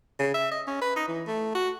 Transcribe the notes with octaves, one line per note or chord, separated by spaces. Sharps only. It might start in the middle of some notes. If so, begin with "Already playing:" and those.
C#3
E5
D#5
C#4
B4
D#4
E3
A3
F#4